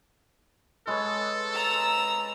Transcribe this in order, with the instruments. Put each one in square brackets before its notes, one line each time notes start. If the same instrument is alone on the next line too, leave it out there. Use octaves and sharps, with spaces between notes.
[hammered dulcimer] G#3 B4 C#5 [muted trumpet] A4
[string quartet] A#5 E6